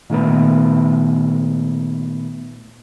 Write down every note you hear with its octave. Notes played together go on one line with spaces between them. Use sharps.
A#2 D#3 A3 B3